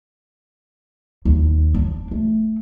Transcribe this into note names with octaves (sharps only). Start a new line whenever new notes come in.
D#2
D4
A3